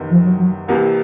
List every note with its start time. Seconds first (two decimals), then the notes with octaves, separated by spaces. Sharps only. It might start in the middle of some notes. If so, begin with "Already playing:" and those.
Already playing: F#1 E2 C3 D#3
0.11 F3
0.25 F#3
0.39 F#3
0.68 C2 C3 E3 G3 A#3